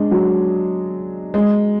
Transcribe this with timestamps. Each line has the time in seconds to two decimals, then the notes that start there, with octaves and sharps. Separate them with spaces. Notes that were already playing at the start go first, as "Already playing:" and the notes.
Already playing: G#3 D4
0.11 F#3
1.34 G#3